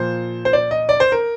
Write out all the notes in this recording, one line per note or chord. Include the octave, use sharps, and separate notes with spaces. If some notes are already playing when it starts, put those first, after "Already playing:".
Already playing: A#2 F3 C5
C5
D5
D#5
D5
C5
A#4